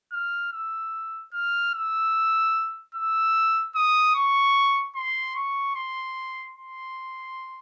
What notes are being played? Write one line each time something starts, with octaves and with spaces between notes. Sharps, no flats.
F6
E6
F6
E6
E6
D#6
C#6
C6
C#6
C6
C6